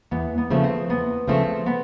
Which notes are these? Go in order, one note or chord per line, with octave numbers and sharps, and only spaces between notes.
E2 B3
B3
C#3 F3 A3
C4
E2 B3
C#3 F3 A3 C4
B3